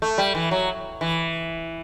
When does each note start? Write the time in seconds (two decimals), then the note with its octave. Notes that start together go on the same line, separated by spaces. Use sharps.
0.02 A3
0.18 G3
0.35 E3
0.51 F#3
1.01 E3